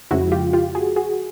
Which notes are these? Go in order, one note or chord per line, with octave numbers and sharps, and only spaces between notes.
F2 C#3 F3 G#3 E4 F#4
F4 G4
F4 G4
F#4 G#4
F#4 G#4